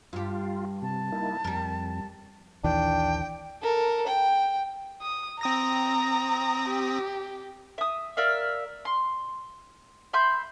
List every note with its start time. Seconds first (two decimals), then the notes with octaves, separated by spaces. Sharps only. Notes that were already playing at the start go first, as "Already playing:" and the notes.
0.13 G2 F4 G4
0.82 C3 A5
1.12 A#3 D#4 E4
1.44 F2 G3 A#4
2.64 A#1 D#2 E3 D4 G5
3.62 A4 A#4
4.07 G5
5.02 D#6
5.41 C4 A#5 D#6 A#6
6.69 G4
7.78 E5 D#6
8.17 A#4 D5 E5 F5
8.85 C6
10.13 E5 B5 C6 G6